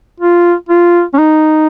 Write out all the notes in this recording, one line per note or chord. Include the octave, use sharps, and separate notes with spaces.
F4
F4
C#4
D#4